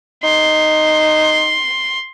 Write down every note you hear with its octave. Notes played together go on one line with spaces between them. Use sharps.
D#4 C6